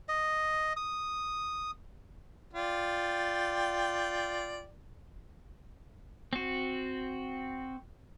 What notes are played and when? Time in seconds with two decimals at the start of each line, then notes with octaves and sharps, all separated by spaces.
0.09 D#5
0.77 D#6
2.53 F4 D5 G5
6.33 C4 F#4